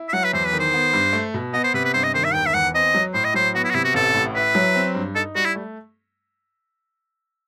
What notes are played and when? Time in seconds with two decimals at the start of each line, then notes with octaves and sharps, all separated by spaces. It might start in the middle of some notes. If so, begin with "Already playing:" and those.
Already playing: E4
0.08 E5
0.13 F#3 F#5
0.24 B4
0.33 E2 C5
0.47 B4
0.53 D#3
0.59 C5
0.74 B3
0.93 G2
1.13 A3
1.34 B2
1.53 B3 D#5
1.64 C5
1.74 C3 B4
1.84 B4
1.94 G2 C5
2.03 D#5
2.14 D#3 C5
2.24 E5
2.34 E1 G5
2.46 E5
2.54 E2 F#5
2.74 C4 D#5
2.95 F#3
3.14 A2 C5
3.24 D#5
3.34 F#3 C5
3.55 B3 F#4
3.64 E4
3.70 F#4
3.74 C3 E4
3.84 F#4
3.94 A1 A4
4.14 A2
4.35 E4 B4
4.55 F#3
4.75 C4
4.95 G2
5.15 D#4 A4
5.35 G3 F#4
5.45 E4
5.55 A3